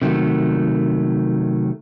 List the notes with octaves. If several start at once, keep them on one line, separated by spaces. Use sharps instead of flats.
C3 D#3 F#3 A3